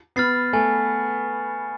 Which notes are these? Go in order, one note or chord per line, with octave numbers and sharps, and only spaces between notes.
B3 B5 F6 A6 C7
A3 G#5